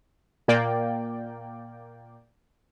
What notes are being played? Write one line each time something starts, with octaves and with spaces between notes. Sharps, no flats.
A#2 A#3 D5 G5